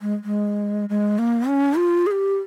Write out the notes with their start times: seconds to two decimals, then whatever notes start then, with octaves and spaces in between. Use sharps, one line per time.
0.02 G#3
0.24 G#3
0.89 G#3
1.19 A#3
1.48 C#4
1.77 F4
2.07 G#4
2.11 G4